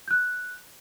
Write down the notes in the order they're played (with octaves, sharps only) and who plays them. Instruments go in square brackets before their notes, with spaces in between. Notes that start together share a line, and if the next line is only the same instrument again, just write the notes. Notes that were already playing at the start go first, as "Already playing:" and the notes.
[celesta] F#6 G6